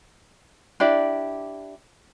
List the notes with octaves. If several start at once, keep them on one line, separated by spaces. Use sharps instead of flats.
D4 E4 G4 D5